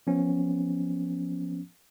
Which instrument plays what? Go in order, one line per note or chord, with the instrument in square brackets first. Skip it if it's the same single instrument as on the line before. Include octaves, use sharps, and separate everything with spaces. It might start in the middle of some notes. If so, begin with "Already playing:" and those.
[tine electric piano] F3 B3 C#4